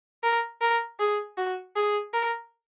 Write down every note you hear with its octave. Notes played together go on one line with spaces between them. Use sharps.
A#4
A#4
G#4
F#4
G#4
A#4